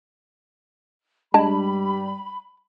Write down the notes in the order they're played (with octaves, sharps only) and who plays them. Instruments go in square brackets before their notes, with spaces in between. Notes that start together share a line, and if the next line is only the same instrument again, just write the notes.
[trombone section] G2 G3 [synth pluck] G#3 D4 [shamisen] A5 [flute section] B5